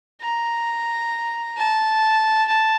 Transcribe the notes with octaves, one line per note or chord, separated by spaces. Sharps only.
A#5
A5
A5